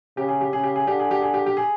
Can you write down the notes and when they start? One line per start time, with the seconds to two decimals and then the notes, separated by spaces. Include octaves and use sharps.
0.17 C#3 G4
0.29 G#4
0.41 G4
0.53 C#3 G#4
0.63 G4
0.76 G#4
0.87 D3 G4
0.99 G#4
1.11 G4
1.22 G#4
1.34 G4
1.46 G4
1.57 G#4